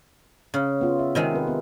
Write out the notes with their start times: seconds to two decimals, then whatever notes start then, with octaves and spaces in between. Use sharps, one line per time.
0.54 C#3
0.81 B3 F4
0.99 E5
1.15 C3 D#3 G#3
1.34 C4 G4 B4
1.47 B3